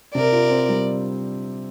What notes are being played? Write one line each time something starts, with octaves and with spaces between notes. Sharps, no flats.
C3 A#4 D5
F4
C4
G3